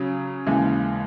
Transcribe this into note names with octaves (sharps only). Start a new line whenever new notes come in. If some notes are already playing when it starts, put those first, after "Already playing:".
Already playing: C#3 F#3 C#4
D#2 C#3 E3 G#3